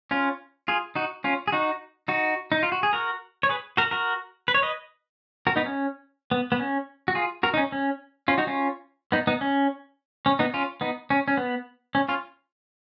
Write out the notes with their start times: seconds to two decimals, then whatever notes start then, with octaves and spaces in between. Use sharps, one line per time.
0.11 C#4 F4
0.68 F4 G#4
0.95 D#4 F#4
1.24 C#4 F4
1.48 G#4
1.52 D#4 F#4
2.08 D#4 F#4
2.52 D#4
2.63 F4
2.72 F#4
2.83 G#4
2.93 F#4 A#4
3.43 C#5
3.49 G#4 B4
3.77 F#4 A#4
3.91 F#4 A#4
4.48 B4
4.54 C#5
4.62 B4 D#5
5.47 F#4 A#4
5.56 B3 D#4
5.66 C#4
6.31 B3
6.52 B3
6.60 C#4
7.08 F#4
7.15 F4 G#4
7.43 F#4 A#4
7.54 D#4
7.57 C#4
7.72 C#4
8.28 C#4 F4
8.38 D#4 F#4
8.47 C#4 F4
9.12 B3 D#4
9.27 B3 D#4
9.41 C#4
10.26 C#4
10.39 B3 D#4
10.54 C#4 F4
10.81 B3 D#4
11.10 C#4
11.28 C#4
11.37 B3
11.95 C#4
12.09 C#4 F4